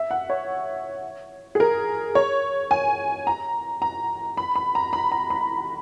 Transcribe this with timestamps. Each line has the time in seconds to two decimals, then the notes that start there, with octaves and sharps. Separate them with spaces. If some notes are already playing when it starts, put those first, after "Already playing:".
Already playing: E5
0.11 F#5
0.30 C#5
1.55 G#4
1.60 A#4
2.15 C#5
2.71 G#5
3.27 A#5
3.82 A#5
4.37 B5
4.55 B5
4.75 A#5
4.93 B5
5.12 A#5
5.30 B5